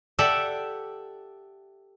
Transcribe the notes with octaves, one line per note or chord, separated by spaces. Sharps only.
G4 A4 D5 E5 F#5